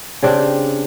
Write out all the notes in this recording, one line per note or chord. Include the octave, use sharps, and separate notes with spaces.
C#3 C4 D4 G4